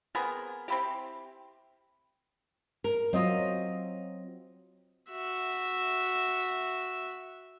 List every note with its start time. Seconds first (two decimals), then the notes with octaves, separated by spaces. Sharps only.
0.15 B3 C4 G#4 A#4
0.68 C4 E4 G4
2.84 A#4
3.13 F#3 C4 F4 D#5
5.11 F#4 E5